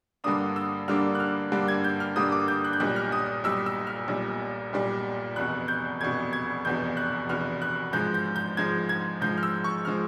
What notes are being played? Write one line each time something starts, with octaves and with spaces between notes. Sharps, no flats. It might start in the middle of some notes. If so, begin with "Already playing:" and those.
G2 D3 G3 A#3 D4 D#6
E6
G2 D3 G3 A#3 D4 F6
F#6
F6
G2 D3 G3 A#3 D4
G#6
G6
F6
G2 D3 G3 A#3 D4 D#6
D6
G6
F#6
G6
B1 A#2 G3 F#6
F6
D#6
B1 A#2 G3 E6
E6
F6
B1 A#2 G3
B1 A#2 G3
F1 E2 B2 F#6
G6
F1 E2 B2 G#6
G#6
F1 E2 B2 G6
F#6
F1 E2 B2 F6
F#6
G#2 F3 G#3 G6
G6
G6
G#2 F3 G#3 G#6
G#6
G#2 F3 G#3 G6
F6
E6
C#6
F3 G#3 F6